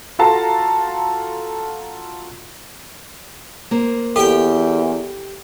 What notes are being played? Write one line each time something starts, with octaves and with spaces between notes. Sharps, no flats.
F4 F#4 A4 F5 A5 A#5
A#3 C5
E2 G4 A4 G5